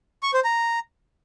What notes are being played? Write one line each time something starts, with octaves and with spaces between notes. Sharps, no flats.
C#6
C5
A#5